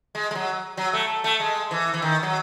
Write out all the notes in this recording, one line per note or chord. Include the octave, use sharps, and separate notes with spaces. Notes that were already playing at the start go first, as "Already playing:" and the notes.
G#3
G#3
F#3
F#3
A3
A3
G#3
E3
E3
D#3
F#3